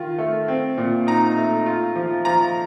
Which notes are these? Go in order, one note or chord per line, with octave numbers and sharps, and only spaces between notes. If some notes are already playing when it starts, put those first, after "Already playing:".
Already playing: D#3 F4
A3
C4
A#2
D#4 A#5
A3
F4
F3
F3 A#5